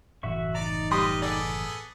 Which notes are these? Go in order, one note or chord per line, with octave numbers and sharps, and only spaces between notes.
F#1 A2 E3 F#4 E5 C#6
D#4 D5 A#5
G3 B4 D#5 C6 D#6
B3 G#4 A4 D5